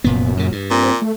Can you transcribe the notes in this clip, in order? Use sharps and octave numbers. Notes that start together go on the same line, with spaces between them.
F1 F#2 A#2 B3
A#2 C#3
G2
A#2 C4
A3